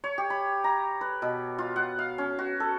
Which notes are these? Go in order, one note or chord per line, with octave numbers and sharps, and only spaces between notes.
C#5
G4
B5
A#5
B4
B2
F4
F#5
F5
C#4
F#4
A4